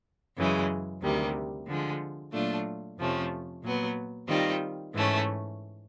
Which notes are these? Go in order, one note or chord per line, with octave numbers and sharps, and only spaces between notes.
F#2 C#3 E3 G#3
D2 C3 D#3 G3
D3 F3 G#3
A#2 F#3 A3 D4 F4
F2 C3 F3 A3 C#4
A#2 F#3 B3
D#3 G3 C4 F4
G#2 E3 A3 C#4